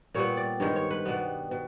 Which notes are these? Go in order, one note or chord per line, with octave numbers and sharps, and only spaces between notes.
A#2 G3 B3 C#5
D5
G2 D#3 G#3 C#5
C#5
B4
B2 G3 B3
B2